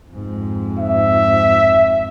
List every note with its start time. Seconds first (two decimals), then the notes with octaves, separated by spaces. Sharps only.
0.11 F2 G#2
0.79 E5